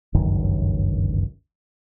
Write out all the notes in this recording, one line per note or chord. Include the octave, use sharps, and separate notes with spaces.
G1 C#2 F#2 D#3